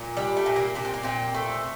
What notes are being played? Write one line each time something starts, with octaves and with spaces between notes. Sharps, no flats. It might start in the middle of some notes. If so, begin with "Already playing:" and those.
Already playing: A#2
G3 D4
A3
A#2
A#3
A#2 D4
C4
A#3
A#2 C4
A3